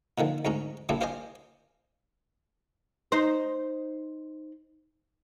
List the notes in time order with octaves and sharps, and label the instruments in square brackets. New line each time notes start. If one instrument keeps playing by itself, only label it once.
[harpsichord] A#2 D3 D#3 F3
D2 G#2 C#4 A#5
A#2 C#3 G3 D4 E4
F4 C5 D5 D#5 G#5
[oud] D#4 C5